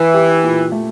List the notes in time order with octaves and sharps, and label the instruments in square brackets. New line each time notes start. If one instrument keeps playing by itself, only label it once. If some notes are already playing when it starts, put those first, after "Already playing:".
Already playing: [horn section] E3 [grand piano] E4
[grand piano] G4
A#2
A3